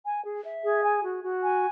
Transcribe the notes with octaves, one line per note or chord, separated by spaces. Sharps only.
G#5
G#4
E5
G#4
G#5
F#4
F#4
G#5